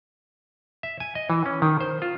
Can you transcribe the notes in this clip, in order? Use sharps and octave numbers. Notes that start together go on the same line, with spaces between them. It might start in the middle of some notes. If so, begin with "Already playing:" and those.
E5
G#5
D#5
E3
C#4
D#3
C5
F4